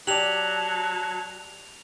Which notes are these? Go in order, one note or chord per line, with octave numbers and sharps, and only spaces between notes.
F#3 G4 D5 A5 F7 F#7